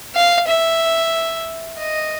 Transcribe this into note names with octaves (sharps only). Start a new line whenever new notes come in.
F5
E5
D#5